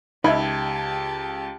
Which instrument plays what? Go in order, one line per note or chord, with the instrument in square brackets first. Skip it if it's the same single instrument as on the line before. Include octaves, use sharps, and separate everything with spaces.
[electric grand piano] C#2 G#6 [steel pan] D#4 E5 [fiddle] G4 A5 [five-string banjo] B5